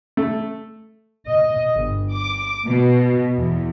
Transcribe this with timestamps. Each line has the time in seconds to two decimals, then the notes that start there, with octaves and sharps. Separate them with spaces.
0.17 A3
1.28 D#5
1.74 G1
2.13 D6
2.68 B2
3.39 E2